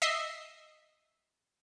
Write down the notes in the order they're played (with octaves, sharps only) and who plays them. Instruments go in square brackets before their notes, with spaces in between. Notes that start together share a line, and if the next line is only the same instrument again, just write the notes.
[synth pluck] D#5 E5 C7